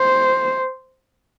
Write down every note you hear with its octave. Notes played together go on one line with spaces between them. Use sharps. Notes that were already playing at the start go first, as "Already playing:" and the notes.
Already playing: C5